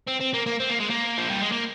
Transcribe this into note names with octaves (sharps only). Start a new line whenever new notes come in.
C4
C4
A#3
A#3
C4
A#3
G#3
A#3
F3
G3
G#3
A#3